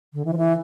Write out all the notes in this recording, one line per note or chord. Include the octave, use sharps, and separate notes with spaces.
D3
E3
F3
E3